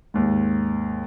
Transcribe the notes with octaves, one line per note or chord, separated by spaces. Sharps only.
D#2 G#2